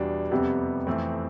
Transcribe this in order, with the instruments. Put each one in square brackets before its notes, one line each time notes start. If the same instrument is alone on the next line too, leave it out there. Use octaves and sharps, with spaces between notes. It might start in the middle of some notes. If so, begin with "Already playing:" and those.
Already playing: [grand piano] E2 B2 G3 D4
F2 C3 G3 B3
F2 E3 A3 C4